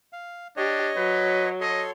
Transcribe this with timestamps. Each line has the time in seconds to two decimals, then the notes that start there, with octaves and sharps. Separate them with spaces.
0.13 F5
0.57 D4 G4 C#5 D#5
0.96 F#3 B4
1.61 A4 C#5 D#5 C6